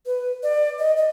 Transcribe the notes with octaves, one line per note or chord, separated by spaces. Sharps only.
B4
D5
D#5
D#5